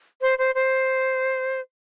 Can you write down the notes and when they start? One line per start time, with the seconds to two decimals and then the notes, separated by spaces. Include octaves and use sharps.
0.21 C5
0.38 C5
0.55 C5